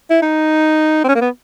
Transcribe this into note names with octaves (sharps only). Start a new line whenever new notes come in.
E4
D#4
C4
C#4
A#3
B3